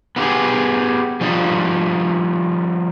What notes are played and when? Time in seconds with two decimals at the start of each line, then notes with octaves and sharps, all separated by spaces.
0.16 B3 E4 F4 G4 G#4
1.21 F3 G3 D#4